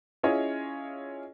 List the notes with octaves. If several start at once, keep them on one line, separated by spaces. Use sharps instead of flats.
C#4 E4 F4 G#4 C#5 D#5